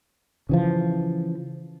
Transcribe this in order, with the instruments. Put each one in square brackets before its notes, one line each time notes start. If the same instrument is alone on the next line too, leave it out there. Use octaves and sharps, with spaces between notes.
[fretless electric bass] C#3 E3 F3